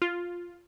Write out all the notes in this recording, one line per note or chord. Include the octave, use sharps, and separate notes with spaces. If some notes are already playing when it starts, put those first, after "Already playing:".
F4